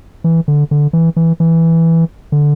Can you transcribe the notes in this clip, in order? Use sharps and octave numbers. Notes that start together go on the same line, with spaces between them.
E3
D3
D3
E3
E3
E3
D3